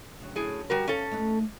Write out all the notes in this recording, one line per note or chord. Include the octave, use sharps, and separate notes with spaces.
D2 C#3 F#3
A2 G#4
G3 F#4 A#4
E2 C#4 A4 C#5 F5
A3 D#4 B4